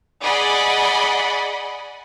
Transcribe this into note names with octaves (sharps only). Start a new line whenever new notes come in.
G#4 D5 D#5 F#5 B5